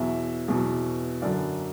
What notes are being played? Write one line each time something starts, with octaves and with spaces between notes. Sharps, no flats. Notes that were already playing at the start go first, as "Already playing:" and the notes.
Already playing: E2 B2 F#3 E5
E2 B2 F#3
F#2 D3 F#3 D5